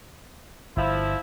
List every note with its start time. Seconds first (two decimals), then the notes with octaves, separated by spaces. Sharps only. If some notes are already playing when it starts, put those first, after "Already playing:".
0.77 G1 F3 E4